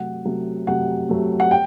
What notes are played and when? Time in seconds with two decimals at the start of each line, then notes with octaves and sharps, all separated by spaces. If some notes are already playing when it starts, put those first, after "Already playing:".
Already playing: C3 F#3 A3 F#5
0.25 C3 F#3 A3
0.67 C3 F#3 A3 F#5
1.09 C3 F#3 A3
1.40 F#5
1.51 G5